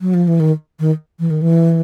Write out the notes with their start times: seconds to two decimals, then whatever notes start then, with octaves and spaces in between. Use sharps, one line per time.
0.01 F#3
0.14 F3
0.27 E3
0.40 D#3
0.80 D#3
1.19 E3
1.30 D#3
1.41 E3